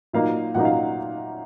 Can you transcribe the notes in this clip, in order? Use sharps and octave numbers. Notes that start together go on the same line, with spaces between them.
A#2 F#3 A#3 D#4 F5
A#2 F#3 A#3 D#4 F#5
F5